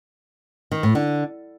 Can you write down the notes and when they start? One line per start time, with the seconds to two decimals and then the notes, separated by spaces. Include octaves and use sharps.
0.72 D#3
0.83 A2
0.95 D3